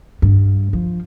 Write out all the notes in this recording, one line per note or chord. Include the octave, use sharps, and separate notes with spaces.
G2
F3